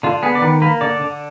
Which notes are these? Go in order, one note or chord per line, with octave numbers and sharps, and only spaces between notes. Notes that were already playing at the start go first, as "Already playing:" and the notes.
D3 F4
B3 G#4
D5
D#3 B4
A#3 B4
D3 D5
D3